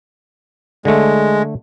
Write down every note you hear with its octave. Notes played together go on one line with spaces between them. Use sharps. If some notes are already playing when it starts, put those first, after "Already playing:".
D3 G#3 A3